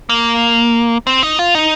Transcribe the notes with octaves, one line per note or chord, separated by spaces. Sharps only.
A#3
C4
D#4
F4
D#4